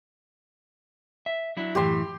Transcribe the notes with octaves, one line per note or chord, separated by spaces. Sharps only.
E5
F#3 D4 E4
F#2 A2 E3 G4 C6